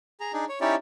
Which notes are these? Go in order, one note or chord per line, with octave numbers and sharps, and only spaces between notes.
G#4 A#5
D4 D#4 G#4
C#5
C#4 D#4 E4 G4 C#5 D5